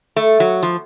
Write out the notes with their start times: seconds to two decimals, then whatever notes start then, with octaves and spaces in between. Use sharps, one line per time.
0.16 A3
0.40 F#3
0.63 F3